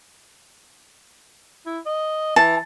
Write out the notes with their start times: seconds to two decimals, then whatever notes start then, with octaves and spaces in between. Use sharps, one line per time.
1.66 E4
1.85 D#5
2.36 E3 A5